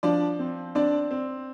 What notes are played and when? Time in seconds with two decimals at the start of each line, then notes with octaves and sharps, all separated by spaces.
0.03 F3 D4 D5
0.39 C4
0.75 C4 D4 D5
1.11 C4